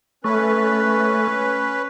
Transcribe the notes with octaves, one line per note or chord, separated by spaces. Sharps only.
A3 C#4 B4